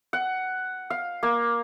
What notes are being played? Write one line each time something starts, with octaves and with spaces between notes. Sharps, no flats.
F#5
F5
A#3